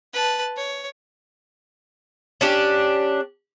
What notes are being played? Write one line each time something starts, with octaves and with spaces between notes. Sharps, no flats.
B4 A5
C#5
C#4 D4 G4